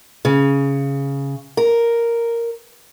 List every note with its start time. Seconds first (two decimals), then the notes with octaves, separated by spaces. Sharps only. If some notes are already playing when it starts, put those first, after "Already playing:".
0.25 C#3
1.57 A#4